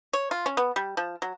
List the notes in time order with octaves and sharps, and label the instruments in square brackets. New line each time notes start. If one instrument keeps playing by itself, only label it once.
[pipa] C#5
F4
C#4
B3
G3
F3
F#3